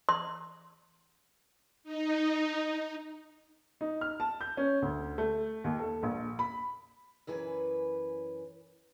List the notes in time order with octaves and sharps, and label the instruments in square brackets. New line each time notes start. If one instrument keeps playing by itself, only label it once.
[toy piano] C6
[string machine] D#4
[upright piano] D#4
F6
A5
G6
C#4
D2
A3
D#2
A4
A#1
B5
[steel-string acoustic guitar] F#2 E3 B4 G#5